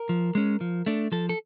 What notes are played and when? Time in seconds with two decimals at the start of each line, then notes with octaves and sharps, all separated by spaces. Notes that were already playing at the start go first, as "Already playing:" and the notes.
Already playing: A#4
0.09 F3
0.35 G#3 C#4
0.61 F3
0.86 A3 D4
1.12 F3 A4
1.29 A4